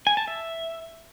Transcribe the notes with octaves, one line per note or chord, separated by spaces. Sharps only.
G#5
A5
E5